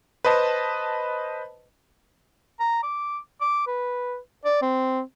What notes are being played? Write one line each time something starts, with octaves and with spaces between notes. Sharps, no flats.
B4 C5 D#5 A5
A#5
D6
D6
B4
D5
C4